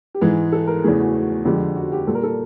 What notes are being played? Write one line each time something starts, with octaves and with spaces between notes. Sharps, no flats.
G4
G#2 E3 G#3 G#4
A4
A#4
E2 C#3 E3 A3 G#4
F#4
F#4
F2 D3 F3 G#3 G4
F#4
G4
A#2 G3 A4
A#4
A4